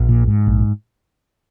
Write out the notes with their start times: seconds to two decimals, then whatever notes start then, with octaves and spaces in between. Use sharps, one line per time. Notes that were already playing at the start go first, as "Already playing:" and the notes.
Already playing: A#1
0.09 A#2
0.28 G#2
0.47 A#1